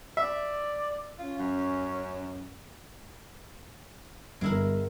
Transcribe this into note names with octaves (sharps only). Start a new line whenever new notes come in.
D5 E5
C#4 F4
F#2
G1 G#3 E4 A#4